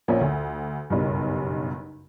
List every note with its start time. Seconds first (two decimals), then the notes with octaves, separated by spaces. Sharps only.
0.08 A#1 F3 A#3 C#4
0.21 D2
0.90 F#1 B1 G2